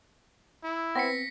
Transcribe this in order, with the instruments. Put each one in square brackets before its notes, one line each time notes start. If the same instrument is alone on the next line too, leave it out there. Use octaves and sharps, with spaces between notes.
[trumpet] E4
[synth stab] B3 C4 [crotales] A#6 B6 C#7